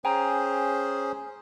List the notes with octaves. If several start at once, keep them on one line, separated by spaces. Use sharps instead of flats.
C#4 G#4 C5 G5 G#5 A#5